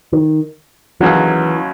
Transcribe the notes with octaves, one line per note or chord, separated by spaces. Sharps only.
D#3
D#2 C#3 E3 F#3